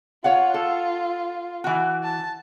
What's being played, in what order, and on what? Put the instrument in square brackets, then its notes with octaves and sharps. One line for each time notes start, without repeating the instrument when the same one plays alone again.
[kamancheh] F4 [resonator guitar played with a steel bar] C#5 F5 F#5
[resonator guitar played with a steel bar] A4
E3 F#4
[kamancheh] A5